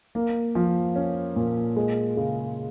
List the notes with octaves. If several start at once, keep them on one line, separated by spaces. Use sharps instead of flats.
A#3
F3
C#4
A#2
G#3
C#3